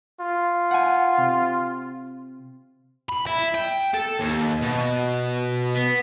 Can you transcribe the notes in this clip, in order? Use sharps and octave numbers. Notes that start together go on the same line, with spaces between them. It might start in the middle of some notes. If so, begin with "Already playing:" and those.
F4
F#5 G#5
C3
B5
E4
G5
A4
D#2
B2
B3